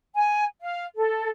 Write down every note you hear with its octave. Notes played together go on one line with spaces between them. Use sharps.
G#5
F5
A4